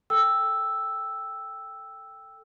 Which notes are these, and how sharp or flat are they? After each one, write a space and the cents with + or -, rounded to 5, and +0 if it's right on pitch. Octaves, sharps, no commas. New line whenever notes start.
A4 +0 G5 +5 E6 +0